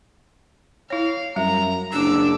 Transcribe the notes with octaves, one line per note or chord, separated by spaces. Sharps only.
E4 C#5 F5
F#2 G3 E5 A#5
F#1 D4 D6 E6